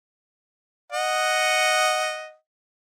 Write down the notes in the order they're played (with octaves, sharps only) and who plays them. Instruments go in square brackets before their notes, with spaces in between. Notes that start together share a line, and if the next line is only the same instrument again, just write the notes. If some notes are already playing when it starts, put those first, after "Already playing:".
[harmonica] D#5 F#5